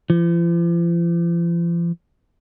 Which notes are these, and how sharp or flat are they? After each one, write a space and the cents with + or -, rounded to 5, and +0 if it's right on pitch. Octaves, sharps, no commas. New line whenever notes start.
F3 -45